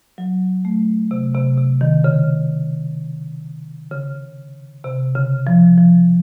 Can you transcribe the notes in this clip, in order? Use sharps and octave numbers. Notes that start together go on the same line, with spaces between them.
F#3
A3
C3
C3
C3
D#3
C#3
C#3
C3
C#3
F3
F3